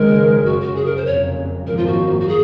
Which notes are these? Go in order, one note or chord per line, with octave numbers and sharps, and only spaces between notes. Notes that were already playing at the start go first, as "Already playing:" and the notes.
Already playing: F#1 F#2 D#3 G#3 A#4
F#1 F#2 C#3 F#4
F#4
G#4
A#4
C5
F#1 F2 C#3 F#3 A#3 C#5
G#1 F#2 F3 A#3 A#4
F4
F#4
F#4
G#4